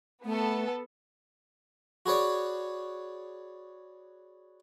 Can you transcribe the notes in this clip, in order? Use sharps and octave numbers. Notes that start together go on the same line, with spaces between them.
A3 B3 A4
F#4 G#4 B4 C#5 D5